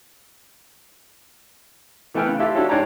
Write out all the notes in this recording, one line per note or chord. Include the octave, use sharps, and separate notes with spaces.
E3 A3 B3 G5 G#5 F6
C#3 F#6
E4 F4 G4 A4 E5 F5
D4 E4 F#4 G4 A4 C#5
G#2 D4 C#5 G5 A5 A#5